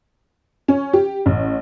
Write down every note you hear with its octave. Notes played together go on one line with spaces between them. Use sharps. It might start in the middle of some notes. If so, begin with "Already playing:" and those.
C#4
G4
A1